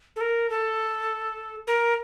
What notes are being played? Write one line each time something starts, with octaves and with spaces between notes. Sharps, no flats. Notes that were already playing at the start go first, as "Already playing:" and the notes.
A4
A#4
A4
A#4